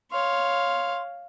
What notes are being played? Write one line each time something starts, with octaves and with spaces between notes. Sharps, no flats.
C#5 F5 C6